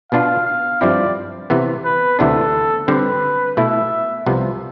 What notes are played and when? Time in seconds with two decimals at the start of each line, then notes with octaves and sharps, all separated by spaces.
0.12 B2 B3 D4 F4 F5
0.46 F5
0.81 G2 F3 C4 E4 D5
1.50 C3 E3 B3
1.85 B4
2.19 D2 C3 E3 B3 D4 A4
2.88 D3 G3 C4 B4
3.57 B2 A3 E4 E5
4.26 C2 C3 F3 B3